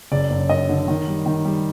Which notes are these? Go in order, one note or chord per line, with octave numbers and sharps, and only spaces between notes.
F#1 D5
F#2
F#2 D#5
D3
D#3
G3
D#3
G3